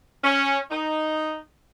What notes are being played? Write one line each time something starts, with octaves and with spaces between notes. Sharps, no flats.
C#4
D#4